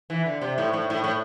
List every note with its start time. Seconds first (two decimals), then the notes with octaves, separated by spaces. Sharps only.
0.10 E3
0.26 D3
0.42 C3
0.58 A2
0.73 A2
0.90 A2
1.04 A2